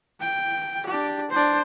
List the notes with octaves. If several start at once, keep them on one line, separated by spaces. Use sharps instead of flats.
G5
D4 G4
D4 C5